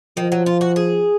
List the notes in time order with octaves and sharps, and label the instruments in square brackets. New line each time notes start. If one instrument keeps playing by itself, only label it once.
[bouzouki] D#3 [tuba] F3
[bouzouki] F#3
F4
F#4
G#4